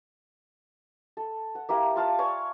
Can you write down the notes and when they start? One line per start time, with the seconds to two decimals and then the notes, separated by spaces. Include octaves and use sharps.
1.17 A4
1.55 F#5
1.69 A#3 E4 G4
1.96 F4 F5 A5
2.19 C#5 D5 G#5